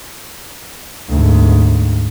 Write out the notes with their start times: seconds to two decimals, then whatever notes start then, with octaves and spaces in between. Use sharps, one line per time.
1.10 D2 G#2